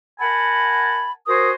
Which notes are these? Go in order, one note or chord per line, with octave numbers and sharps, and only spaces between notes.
A#4 F#5 G#5 A5 B5
F#4 A#4 C5 G#5 D#6